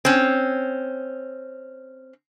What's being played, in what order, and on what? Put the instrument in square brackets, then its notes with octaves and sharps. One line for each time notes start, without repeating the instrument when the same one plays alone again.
[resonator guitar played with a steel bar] C4 C#4